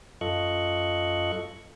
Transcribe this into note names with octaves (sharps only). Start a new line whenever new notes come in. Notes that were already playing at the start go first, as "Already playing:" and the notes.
F#2 F4 A4 D#5 C#6 F#6